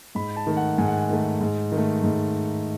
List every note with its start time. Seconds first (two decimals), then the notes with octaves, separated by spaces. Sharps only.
0.15 G#2 B5
0.37 A5
0.47 D#3 A3
0.57 F#5
0.78 G#2 G#5
0.88 F#5
0.97 G#5
1.10 D#3 A3
1.41 G#2
1.72 D#3 A3
2.03 G#2